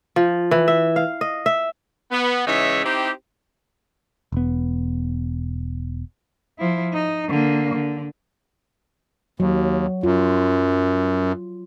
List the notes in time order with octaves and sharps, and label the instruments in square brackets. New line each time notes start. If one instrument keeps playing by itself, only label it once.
[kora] F3
E3
E5
F5
D#5
E5
[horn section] B3
G#2 C#3 E3 D#4 C#5 E5
C4 D#4 E4 G4
[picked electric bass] E1 B3
[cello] F3 E4
D#4
D3 A#3
D3
[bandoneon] D#2 [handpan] F#3
[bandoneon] F#2 [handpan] F4